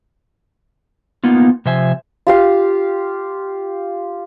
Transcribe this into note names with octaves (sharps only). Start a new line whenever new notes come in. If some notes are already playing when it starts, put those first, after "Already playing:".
A#3 B3 D#4 F4
C3 F3 C5 E5 G#5
F4 G4 F5